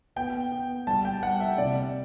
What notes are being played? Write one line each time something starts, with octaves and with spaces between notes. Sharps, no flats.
B3 G5
B3
G3 A5
G5
G3 F#5
E5
C3 D5